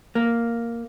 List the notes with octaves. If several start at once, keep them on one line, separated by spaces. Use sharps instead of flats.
A#3